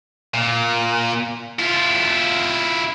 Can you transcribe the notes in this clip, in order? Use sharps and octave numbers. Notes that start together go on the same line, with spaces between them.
A#2
E4 F4